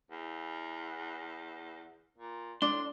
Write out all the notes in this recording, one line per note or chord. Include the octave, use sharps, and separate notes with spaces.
E2
A#2
A2 D4 C6